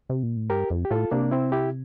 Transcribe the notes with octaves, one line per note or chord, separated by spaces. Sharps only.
C3
A#2
A2
G2 G4 A#4
F2
G4
A2 F4 A4
C3 A#3 D4
C4 E4
E4 G4